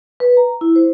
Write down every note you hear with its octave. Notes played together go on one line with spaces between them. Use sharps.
B4
A#5
E4
C5